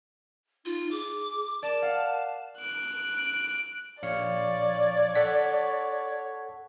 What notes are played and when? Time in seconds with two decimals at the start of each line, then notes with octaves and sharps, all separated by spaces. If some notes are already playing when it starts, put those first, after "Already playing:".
0.66 D#4 F4
0.91 G#4 D6
1.63 A#4 D5 A5
1.82 F5 F#5
2.59 F#6 D7
4.03 A#1 C#5 D5 F5 C#7
5.15 A4 F#5 B6